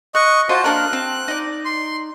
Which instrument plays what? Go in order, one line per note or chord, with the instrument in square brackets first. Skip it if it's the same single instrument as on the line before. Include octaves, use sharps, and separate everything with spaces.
[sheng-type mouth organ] D#5 C#6 [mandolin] F#6
[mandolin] F4 D#5 A5 [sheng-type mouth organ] F#4 C5
[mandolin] A#3 D4 A#4 [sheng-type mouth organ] F#6
[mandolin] C4
D#4 D5
[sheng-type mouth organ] C6